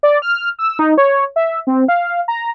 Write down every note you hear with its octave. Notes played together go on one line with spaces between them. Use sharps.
D5
F6
E6
D#4
C#5
E5
C4
F5
A#5